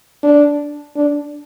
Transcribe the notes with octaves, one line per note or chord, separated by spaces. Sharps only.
D4
D4